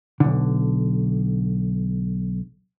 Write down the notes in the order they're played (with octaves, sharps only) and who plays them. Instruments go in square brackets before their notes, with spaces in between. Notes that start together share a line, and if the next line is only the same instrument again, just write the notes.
[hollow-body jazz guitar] B1 D3